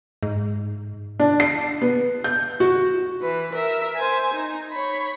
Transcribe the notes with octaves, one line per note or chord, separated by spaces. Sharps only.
G#2
D4
C7
B3
G6
F#4
E3 B4
A#4 E5
C5 G#5
D#4
C#5 B5